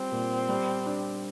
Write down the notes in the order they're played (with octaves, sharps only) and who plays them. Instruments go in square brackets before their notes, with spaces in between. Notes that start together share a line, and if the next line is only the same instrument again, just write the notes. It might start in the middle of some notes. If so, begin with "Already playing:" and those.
Already playing: [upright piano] G3 F4 [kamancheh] C4
[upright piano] A#2
G3
D4